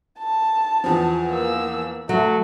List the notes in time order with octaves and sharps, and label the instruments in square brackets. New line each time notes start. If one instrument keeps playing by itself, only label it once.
[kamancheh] A5
[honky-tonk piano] E2 F3
[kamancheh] A#3 E6
[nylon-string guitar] F#3 [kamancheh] A3